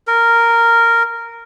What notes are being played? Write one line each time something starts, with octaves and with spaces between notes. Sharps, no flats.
A#4